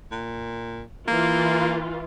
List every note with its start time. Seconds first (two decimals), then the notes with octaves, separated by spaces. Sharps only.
0.12 A#2
1.08 E3 A#3 F4